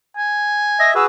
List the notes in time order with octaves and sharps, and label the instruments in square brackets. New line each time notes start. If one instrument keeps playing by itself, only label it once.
[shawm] G#5
[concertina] D#5 E5 [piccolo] A#6
[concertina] F#4 G#4 B4 [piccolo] E6